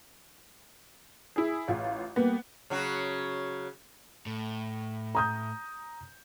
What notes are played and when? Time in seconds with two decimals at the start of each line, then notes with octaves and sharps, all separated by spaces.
1.36 E4 G#4
1.68 A1 F4
2.16 G3 A#3 B3
2.70 C#3 F#3 F#4
4.26 A2
5.15 A#5 D#6 G6